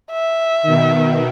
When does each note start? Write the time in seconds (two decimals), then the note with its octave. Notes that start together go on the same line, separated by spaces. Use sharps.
0.11 E5
0.62 B2 D#3